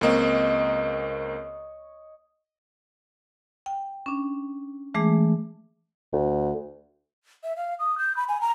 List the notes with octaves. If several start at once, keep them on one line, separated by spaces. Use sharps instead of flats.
C#2 A#3 C4 C#5 D#5
G5
C#4 D4
E3 G#3 A3 G#4 D6
D2
E5
F5
D#6
G6
B5
G#5
A#5